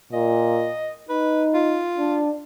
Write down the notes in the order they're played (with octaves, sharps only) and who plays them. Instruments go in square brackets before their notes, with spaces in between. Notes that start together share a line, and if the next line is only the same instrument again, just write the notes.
[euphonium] A#2 [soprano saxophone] D#5
[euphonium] D#4 [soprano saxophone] B4
[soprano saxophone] F4
[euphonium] D4